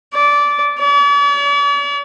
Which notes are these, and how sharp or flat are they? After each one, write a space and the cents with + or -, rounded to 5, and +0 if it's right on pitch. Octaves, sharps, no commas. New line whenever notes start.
D5 -15
D5 -45